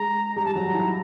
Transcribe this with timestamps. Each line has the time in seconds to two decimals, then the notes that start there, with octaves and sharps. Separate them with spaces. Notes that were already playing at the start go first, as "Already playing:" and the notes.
Already playing: G#3 G#4 A#5
0.36 G3 G4 A#5
0.45 A5
0.54 F#3 F#4 A#5
0.74 E4
0.87 F4